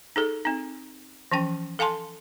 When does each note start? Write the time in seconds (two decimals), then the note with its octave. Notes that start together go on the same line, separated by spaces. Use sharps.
0.16 D#4 G#4 A4
0.45 C4 D#4
1.31 E3 F3 C#4 G5
1.79 A4 F5 G#5 A5 C6